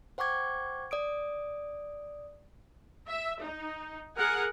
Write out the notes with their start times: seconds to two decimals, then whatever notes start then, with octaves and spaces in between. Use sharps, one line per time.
0.18 C5 F#5 G5 C#6 D6 G#6
0.91 D5 D#6 D7
3.08 E5
3.42 D#4
4.17 G#4 A#4 F#5 G#5